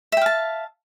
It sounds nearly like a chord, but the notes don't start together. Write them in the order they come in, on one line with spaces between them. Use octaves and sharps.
E5 G5 F5 A5